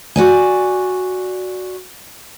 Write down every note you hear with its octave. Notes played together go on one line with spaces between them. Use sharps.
F#4 D5 G#5